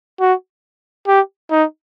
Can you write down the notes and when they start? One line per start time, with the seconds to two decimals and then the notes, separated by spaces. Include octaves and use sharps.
0.20 F#4
1.08 G4
1.51 D#4